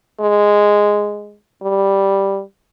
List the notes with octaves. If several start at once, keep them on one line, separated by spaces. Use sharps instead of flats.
G#3
G3